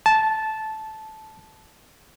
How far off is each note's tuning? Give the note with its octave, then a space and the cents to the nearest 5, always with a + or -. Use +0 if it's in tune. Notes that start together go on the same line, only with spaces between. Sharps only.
A5 -10